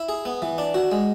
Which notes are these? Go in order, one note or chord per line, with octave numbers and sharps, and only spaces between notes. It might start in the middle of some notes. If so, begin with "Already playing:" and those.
Already playing: E4
G#4
B3
E3
D4
F#4
G#3